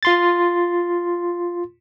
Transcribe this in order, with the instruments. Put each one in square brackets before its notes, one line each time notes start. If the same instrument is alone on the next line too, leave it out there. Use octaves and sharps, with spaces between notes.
[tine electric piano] F4 C6 A6